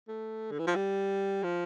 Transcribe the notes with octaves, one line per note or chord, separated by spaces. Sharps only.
A3
D3
E3
F3
G3
F3